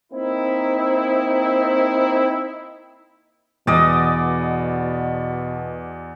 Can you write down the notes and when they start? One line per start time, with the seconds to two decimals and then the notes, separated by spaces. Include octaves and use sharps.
0.13 A#3 C4 D#4 E4
3.67 E2 B2 D5 D#5